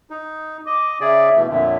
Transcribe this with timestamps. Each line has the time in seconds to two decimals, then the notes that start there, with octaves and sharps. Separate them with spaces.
0.10 D#4
0.66 D#5 D6
1.01 C#3 G#4 D5 E5
1.36 B2 E3 A3
1.49 F2 A#2 D3 C#5 E5